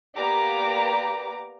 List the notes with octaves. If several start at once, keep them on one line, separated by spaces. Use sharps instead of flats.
A#3 B3 G4 D5 A#5 D6